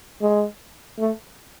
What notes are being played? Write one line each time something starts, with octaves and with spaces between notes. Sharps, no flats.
G#3
A3